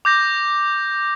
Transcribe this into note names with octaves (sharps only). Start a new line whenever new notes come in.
D6 G6 A#6